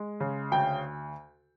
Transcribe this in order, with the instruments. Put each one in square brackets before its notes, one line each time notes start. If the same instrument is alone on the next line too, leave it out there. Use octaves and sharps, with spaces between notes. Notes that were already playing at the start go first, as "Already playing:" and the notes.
Already playing: [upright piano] G#3
C#3
[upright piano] D2 [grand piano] G5